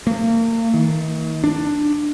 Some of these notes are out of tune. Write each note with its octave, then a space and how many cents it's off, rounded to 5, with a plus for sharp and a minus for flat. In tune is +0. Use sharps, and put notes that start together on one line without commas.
A#3 -35
D#3 +40
D4 +10